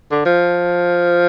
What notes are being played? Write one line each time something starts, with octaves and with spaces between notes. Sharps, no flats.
D3
F3